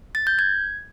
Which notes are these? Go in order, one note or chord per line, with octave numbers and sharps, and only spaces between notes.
A6
G6
G#6